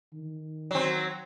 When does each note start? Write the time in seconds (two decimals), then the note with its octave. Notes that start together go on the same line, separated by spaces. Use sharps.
0.13 D#3
0.71 F#3 C4